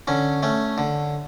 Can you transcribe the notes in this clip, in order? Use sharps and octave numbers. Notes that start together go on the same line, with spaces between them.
D3 C#4
A3 C#4
D3